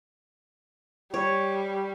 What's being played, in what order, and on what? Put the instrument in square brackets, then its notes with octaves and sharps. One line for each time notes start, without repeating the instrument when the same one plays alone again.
[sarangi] G3 [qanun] C#5